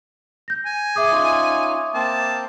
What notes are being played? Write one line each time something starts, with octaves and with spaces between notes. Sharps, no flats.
G6 A#6
G#5
G#4 E5 D6 D#6
C#4 D#4 F4
A#3 C4 A5